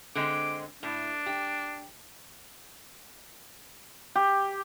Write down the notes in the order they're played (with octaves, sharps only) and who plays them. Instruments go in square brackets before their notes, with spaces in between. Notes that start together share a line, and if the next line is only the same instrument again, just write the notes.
[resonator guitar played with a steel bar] D3 G#3 C4 [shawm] D6
[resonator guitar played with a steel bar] A2 [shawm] D4
[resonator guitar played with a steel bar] G4
[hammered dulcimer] G4